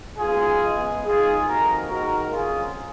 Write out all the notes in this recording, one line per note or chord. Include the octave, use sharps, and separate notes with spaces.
G#2 F#3 B3 F4 G#4
C#2 C#3 G#3 B3
G#1 G#2 D#3 F4 G#4
F2 D#3 A#3 F#4 A#4
G#2 D#3 G#3 F#4 A#4
F2 C#3 F#3 A#3 F4 G#4